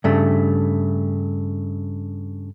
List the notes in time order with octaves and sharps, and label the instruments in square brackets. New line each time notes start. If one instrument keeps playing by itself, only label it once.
[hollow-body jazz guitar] G2 C#3 A3